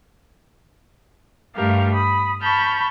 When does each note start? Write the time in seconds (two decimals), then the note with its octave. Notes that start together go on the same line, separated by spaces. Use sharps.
1.56 G2 A3 G4 A#4 F5
1.93 B5 D#6
2.42 A5 B5 C#6 F6 G6